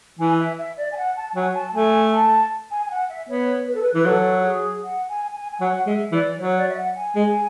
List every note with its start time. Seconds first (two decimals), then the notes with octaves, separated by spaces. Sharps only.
0.19 E3 G#5
0.39 E5
0.58 E5
0.77 D5
0.92 G#5
0.97 F#5
1.16 A5
1.35 F#3 G#5
1.55 A5
1.74 A3 G#5
2.13 A5
2.71 G#5
2.86 G#5
2.90 F#5
3.09 E5
3.29 B3 C#5
3.67 B4
3.75 A4
3.82 B4
3.94 E3 B4
4.06 F#3 A4
4.40 F#4
4.45 G#4
4.83 F#5
5.09 G#5
5.35 G#5
5.52 G#5
5.61 F#3 F#5
5.86 G#3 E5
6.12 E3 D5
6.38 F#3 C#5
6.57 D5
6.69 E5
6.77 F#5
6.96 G#5
7.16 G#3